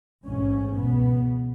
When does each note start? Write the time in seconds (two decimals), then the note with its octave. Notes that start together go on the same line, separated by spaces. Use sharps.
0.25 A1 G#2 C#4
0.76 C#2 B2 B3